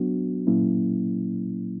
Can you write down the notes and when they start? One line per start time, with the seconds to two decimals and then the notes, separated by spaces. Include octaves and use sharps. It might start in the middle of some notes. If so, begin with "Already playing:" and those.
Already playing: F#3 B3 D4 F#4
0.47 A#2 F#3 A#3 C#4 E4